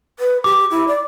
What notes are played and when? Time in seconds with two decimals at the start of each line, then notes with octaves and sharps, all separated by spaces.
0.19 B4
0.44 G4 D6
0.71 E4
0.88 D5